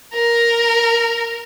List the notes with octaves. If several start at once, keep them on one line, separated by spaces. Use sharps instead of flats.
A#4